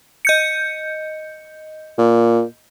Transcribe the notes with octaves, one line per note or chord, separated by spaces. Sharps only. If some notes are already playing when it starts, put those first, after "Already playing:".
D#5 G6 C#7
A#2